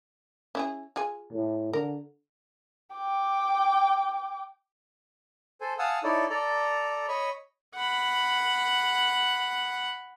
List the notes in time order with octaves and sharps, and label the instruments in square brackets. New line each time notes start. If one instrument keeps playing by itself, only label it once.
[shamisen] C#4 E4 G#4
F4 G#4 G#5
[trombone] A2
[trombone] D3 [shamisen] A#4
[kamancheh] G5 D6
[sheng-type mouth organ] A4 C5 G#5
F5 F#5 G#5 A5 D#6 E6
D#4 E4 A4 C#5 D5
A4 D5 A#5
C#5 D#5 B5 C#6
[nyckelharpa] F#5 B5